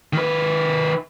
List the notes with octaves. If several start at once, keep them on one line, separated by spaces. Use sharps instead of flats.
D#3 B4